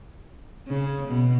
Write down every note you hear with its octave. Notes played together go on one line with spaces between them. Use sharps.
C#3
B2